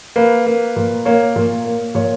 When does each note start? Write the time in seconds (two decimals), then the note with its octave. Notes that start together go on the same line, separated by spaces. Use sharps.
0.16 A#3 B4
0.46 A#3
0.76 A#2
1.05 A#3 C#5
1.36 A#2
1.65 A#3
1.95 A#2 C#5